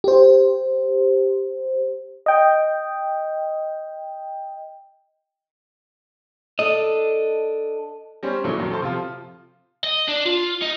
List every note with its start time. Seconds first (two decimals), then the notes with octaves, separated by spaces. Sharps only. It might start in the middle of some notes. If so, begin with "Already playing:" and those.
0.04 G4 C5
2.26 D#5 G5
6.59 D4 A4 D#5
8.23 G3 C#4 C5
8.44 A#2 C#3 E3 F#3 A3 D4
8.57 F#2 D#3 F#4
8.70 A4 C5 A5 C6
8.82 C3 F3 F4
9.84 D#5
10.08 D4
10.26 F4
10.62 D#4